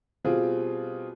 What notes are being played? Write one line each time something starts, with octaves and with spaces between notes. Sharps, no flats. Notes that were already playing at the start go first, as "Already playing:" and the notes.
B2 G3 C4 F4 G#4